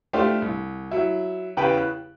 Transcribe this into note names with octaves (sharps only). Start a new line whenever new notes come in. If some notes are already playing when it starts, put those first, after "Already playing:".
A3 D4 F4 G4 C5 F5
C2
F#3 E4
E2 C#3 G4 B4 G5 B5
F#6